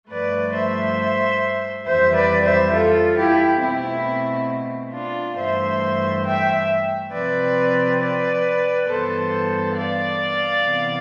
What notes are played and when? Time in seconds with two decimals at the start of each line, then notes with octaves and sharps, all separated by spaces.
0.10 G2 F3 A3 B4 D5
0.55 C5 E5
1.86 F2 E3 G3 C5 E5
2.15 B4 D5
2.44 C5 E5
2.73 F4 A4
3.18 E4 G4
3.61 B2 A3 C4 E4
4.93 D4 F4
5.37 G2 E3 A3 C5 E5
6.25 E5 G5
7.13 C3 F3 C4 B4 D5
8.00 B4 D5
8.88 G2 E3 B3 A4 C5
9.76 D5 F5
10.64 C3 E3 B3